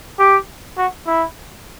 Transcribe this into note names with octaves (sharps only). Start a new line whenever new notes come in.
G4
F#4
E4